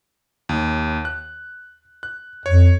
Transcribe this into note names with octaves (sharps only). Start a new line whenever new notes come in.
D#2
F#6
F#6
F2 C#5